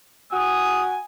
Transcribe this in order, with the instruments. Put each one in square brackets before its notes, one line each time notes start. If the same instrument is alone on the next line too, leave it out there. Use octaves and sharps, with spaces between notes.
[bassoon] F#4 [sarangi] G#5 [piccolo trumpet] D#6